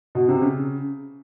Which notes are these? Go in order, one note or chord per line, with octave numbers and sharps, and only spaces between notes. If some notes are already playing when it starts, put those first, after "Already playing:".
B2
C3
C#3